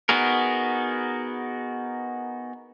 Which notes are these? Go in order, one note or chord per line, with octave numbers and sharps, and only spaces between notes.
B3 D#4 F#4 G#4 A#4